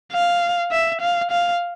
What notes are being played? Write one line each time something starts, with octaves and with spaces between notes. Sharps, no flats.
F5
E5
F5
F5